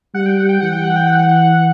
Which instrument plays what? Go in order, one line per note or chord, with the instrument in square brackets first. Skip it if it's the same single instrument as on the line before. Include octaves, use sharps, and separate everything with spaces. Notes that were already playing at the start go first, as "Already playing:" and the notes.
[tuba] G3 [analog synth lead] F#5
[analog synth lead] G5
F#5
G5
[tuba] E3 [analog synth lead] F#5
[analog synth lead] G5
F#5
G5
F#5